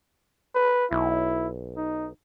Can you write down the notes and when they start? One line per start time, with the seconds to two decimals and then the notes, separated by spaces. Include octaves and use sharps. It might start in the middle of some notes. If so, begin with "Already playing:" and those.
0.55 B4
0.91 B1 E4
1.77 D#4